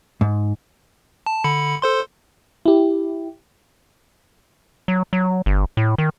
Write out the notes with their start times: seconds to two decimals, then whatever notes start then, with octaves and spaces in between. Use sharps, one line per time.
0.21 G#2
1.26 A5
1.44 D3 B5 C#7
1.82 A4 C5 C6
2.66 E4 G4
4.88 F#3
5.13 F#3
5.46 G1
5.77 A2
5.98 D#3